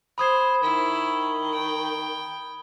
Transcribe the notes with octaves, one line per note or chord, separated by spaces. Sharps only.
C5 B5 D#6 G#6
D#3 E4
G5